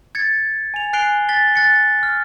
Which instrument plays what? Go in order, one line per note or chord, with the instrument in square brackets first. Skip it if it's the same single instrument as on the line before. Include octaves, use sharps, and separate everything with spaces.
[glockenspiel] G#6 A6 C#7
G#5 F7
G#5 F#6 C7 D7 F7 G7
A6 B6 G7
F#6 A6 C#7
F6